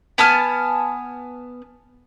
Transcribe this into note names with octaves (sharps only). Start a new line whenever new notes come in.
B3 G#5 A5 F6